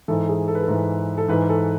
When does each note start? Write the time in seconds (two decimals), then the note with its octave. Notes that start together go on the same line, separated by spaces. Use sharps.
0.08 G#2 E3 A4
0.29 G#4
0.48 A4
0.55 B4
0.63 A4
0.68 G#2 E3
1.18 A4
1.28 G#2 E3 B4
1.49 A4